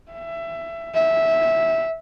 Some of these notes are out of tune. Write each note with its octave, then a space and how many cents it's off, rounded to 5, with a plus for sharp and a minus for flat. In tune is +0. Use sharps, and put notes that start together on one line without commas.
E5 +20
E5 -10